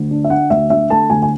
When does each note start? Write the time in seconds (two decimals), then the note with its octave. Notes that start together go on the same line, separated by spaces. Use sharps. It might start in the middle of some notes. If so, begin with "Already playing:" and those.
Already playing: D2
0.11 D4
0.24 E5
0.30 D3 F#5
0.50 D2 E5
0.70 D3 E5
0.90 A3 A5
1.10 D2 G#5
1.22 G#5